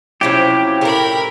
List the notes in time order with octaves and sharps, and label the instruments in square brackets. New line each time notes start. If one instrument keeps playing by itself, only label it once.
[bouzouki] C3 F3 F#3 [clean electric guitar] C#4 E4 [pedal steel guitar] G4
[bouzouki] A2 C#3 [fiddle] A#4 B5